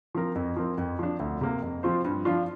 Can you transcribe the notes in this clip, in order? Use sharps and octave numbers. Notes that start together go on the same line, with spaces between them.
F3 C4 A#4
F2
F3 C4 A#4
F2
F3 D4
D2
C3 A#3
F2
F3 C4 F4 C5
G2
F3 D4 F4